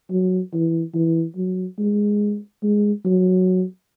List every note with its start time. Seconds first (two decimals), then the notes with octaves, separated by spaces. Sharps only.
0.10 F#3
0.54 E3
0.94 E3
1.36 F#3
1.79 G#3
2.63 G#3
3.05 F#3